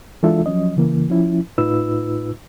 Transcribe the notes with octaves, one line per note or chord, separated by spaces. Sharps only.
E3 G#3 D4 F4 A4 E5
F3 F#3 C#4 D#5
C#3 E3 A#3
F3 C#4 E4
A2 D#4 F4 B4 E6